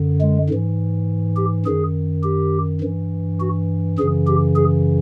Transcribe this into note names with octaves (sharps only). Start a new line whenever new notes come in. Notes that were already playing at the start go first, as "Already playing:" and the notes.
Already playing: F#2 D3
G#3
G#2 E3
G4
F#2 D#3 G#4
G4
G2 E3
F#4
F#2 C#3 E3 G#4
G4
G#4